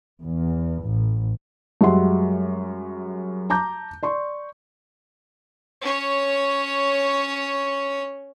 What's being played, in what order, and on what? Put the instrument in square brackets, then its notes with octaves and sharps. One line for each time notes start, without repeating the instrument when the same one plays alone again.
[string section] E2
A1
[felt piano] F#2 G3 G#3 E5 F#5 C6
A5 A#5 D6 G6
D5 C6 C#6
[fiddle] C#4 C#5